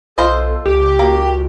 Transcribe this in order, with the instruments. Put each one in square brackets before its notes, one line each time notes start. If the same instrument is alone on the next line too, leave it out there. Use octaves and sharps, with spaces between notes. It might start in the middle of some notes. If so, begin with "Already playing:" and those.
[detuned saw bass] B1 [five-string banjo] F4 C5 D#5 [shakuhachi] A4
[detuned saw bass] C#2 [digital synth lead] G4
[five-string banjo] A#3 [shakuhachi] F#4